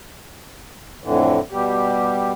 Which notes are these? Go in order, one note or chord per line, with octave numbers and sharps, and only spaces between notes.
F2 A2 D3 E3
B2 G3 G4